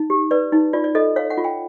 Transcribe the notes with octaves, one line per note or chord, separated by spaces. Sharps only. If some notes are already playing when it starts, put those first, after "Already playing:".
Already playing: D#4
G4
B4 D5
D#4
F4 D5
D5
A4 D#5
C#5 F5
F#5
F4
G5